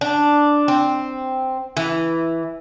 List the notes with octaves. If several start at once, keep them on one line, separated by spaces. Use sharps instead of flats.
D4
C4
E3